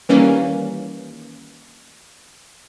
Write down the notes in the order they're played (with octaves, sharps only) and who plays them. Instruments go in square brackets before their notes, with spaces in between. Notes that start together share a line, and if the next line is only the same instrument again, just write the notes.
[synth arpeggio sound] D#3 E3 G3 A#3 C#4